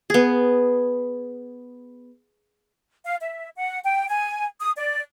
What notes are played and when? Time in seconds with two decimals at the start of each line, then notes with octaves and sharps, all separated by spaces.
0.10 B3 G#4
3.05 F5
3.21 E5
3.57 F#5
3.84 G5
4.09 G#5
4.60 D#6
4.77 D5